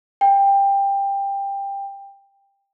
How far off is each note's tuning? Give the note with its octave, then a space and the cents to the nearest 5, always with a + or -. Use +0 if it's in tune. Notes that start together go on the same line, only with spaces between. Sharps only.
G5 +20